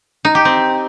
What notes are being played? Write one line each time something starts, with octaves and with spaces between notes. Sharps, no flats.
D#4
G4
C4